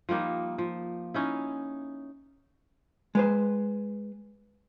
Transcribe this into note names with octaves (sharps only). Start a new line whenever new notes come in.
F3 G3 A#3 D#4
F3
C#4 D#4 E4
G#3 B4 C5